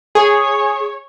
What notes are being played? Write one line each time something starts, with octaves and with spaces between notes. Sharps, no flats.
G#4 C#5